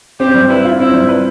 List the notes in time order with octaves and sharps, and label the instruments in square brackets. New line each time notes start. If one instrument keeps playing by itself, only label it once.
[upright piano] C4 [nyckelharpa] G4
[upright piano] G3
[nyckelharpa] E4 [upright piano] B4
[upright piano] F4
[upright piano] C4 [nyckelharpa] E4
[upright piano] G3
B4